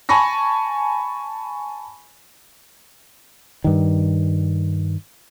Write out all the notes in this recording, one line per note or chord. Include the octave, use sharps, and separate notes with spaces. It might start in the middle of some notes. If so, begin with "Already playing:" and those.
G#5 A5 B5 C#6 A#6
G2 D#3